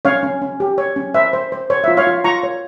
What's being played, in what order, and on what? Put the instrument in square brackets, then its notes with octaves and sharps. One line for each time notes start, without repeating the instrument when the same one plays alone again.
[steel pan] C#4 C#5 F5
C#4
C#4
G4
C#5
C#4
C5 E5
C5
C5
C5 C#5
F4 E5
C#5 F5
F4
F4 A#5 C#6
C#5